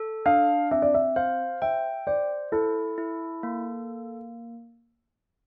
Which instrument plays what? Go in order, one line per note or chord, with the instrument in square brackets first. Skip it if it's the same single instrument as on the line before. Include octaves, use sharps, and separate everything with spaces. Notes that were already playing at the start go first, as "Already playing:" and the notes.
Already playing: [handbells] A4
[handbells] D4 [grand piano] F5
[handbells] C4 [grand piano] E5
[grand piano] D5
E5
[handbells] C5 [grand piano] F5
[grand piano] E5 [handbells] G5
[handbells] C5 [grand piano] D5
[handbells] E4 [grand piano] A4
[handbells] E4
A#3